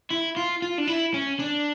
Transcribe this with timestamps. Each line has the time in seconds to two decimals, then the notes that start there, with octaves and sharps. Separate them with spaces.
0.11 E4
0.37 F4
0.62 F4
0.78 D4
0.88 E4
1.14 C#4
1.40 D4